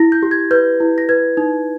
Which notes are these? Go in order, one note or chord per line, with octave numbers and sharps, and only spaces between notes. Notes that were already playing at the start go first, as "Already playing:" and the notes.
Already playing: E4 A#6
G6
G4
G#6
B4 G6
E4
A#6
B4 G#6
D#4